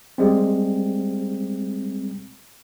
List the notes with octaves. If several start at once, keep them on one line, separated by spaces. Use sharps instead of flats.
G3 G#3 C4